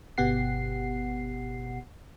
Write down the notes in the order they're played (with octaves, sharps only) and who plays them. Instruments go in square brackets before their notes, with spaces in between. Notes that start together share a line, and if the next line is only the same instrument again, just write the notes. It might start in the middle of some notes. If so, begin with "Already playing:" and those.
[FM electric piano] G1 B2 B3 G4 F#5 C7